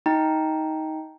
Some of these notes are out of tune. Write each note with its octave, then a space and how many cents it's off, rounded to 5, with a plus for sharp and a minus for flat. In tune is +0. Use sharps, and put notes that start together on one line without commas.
D#4 +15 G5 +0 A#5 +0